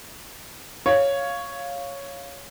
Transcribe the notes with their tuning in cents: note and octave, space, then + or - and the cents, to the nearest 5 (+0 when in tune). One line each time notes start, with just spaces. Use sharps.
C#5 +0 F5 +0